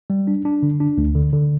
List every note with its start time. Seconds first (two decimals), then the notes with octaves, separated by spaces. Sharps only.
0.10 G3
0.27 D4
0.45 D4
0.63 D3
0.80 D4
0.98 D2
1.15 D3
1.33 D3